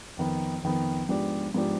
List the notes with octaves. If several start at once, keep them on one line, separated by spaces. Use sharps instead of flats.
F2 D#3 B3
F2 D#3 B3
G#2 F3 B3 D4 G4
G#2 F3 B3 D4 G4